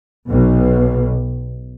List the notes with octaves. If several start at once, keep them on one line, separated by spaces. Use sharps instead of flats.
B1 B2